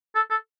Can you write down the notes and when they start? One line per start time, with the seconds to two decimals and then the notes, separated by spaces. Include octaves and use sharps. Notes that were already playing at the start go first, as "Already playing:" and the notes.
0.15 A4
0.30 A4